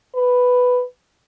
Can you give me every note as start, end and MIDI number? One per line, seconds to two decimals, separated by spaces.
0.15 0.82 71